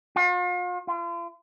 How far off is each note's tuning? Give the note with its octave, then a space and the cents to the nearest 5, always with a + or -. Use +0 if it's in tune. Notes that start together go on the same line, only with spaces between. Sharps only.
F4 +40
F4 -40